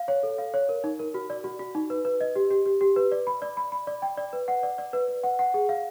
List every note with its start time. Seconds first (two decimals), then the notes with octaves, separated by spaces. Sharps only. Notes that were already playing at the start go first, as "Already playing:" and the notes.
Already playing: F5
0.08 C#5
0.23 A4
0.38 F5
0.54 C#5
0.69 A#4
0.84 D#4
0.99 A#4
1.14 F#4
1.30 D5
1.44 F#4
1.59 F#4
1.75 D#4
1.90 B4
2.05 B4
2.21 D#5
2.36 G4
2.51 G4
2.66 G4
2.81 G4
2.96 B4
3.12 D5
3.27 B5
3.42 D5
3.57 B5
3.72 B5
3.87 D5
4.02 G5
4.17 D5
4.33 B4
4.48 F#5
4.63 D5
4.78 D5
4.93 B4
5.08 B4
5.23 F#5
5.39 F#5
5.54 G#4
5.69 F5